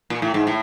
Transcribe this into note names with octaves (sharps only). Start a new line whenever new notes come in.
A#2
A2
G#2
A2